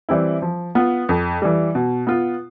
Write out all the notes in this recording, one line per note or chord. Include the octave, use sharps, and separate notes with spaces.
E3 G3 C4 E4
F3
B3 F4
F2
E3 G3
B2
B3 F4